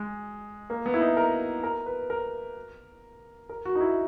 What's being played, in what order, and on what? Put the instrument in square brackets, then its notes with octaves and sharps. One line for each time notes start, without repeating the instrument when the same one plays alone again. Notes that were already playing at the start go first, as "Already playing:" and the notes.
Already playing: [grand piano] G#3
A#3
B3
E4
D#4
A#4
A#4
B4
A#4
A#4
F#4
D#4
E4